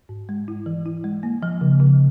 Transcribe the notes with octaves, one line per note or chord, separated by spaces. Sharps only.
G#2
G#3
E4
E3
E4
G#3
A#3
F3
C#3
C#3